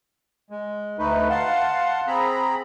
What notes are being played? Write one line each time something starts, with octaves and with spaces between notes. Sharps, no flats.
G#3
D2 A3 D#4 B4
F5 F#5 A5 C6
C4 G#4 A#5 B5